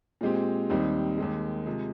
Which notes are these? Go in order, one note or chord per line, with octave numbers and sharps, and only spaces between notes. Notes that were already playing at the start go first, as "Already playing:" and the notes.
A#2 G#3 C4 G4
D#2 D#3 G3 C4 D#4
D#2 D#3 G#3
C3 F3 G#3